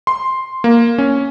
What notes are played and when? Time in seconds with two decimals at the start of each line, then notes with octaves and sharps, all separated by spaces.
0.07 C6
0.64 A#3
0.98 C#4